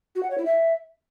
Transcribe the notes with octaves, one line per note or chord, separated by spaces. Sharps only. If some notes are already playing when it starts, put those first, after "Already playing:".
F#4
F#5
C#5
E4
E5